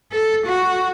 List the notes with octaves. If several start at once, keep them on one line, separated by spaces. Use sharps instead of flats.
A4
F#4